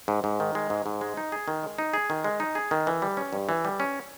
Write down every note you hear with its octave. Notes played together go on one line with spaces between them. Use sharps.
G#2
G#2
D#3
G#3
G#2
G#2
G#3
D#4
G#4
D#3
G#3
D#4
G#4
D#3
G#3
D#4
G#4
D#3
E3
G3
C#4
G2
E3
G3
C#4